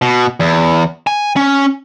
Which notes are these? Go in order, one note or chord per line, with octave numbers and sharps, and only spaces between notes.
B2
E2
G#5
C#4